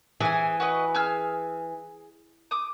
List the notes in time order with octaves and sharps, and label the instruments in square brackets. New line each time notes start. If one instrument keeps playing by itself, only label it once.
[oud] E3 [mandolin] G#4 G#5
[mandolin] F#4 B4 D#5
G#4 E6 F6
D6 D#6